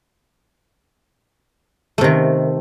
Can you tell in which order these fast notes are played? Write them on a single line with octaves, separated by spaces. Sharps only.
A3 C3 D#3